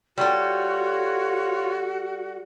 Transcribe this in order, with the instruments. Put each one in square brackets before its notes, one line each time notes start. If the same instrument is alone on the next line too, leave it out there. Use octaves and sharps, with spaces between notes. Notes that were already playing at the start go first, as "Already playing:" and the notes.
[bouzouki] G3 A4 [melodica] F4 C#5 [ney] F#4